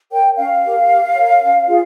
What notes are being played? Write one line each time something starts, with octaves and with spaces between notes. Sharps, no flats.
A#4 C#5 G5
C#4 F5
G4 A#4
G4
A#4 C#5
C#4
F4 G#4